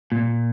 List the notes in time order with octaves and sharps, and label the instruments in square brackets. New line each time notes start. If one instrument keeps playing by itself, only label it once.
[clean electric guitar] A#2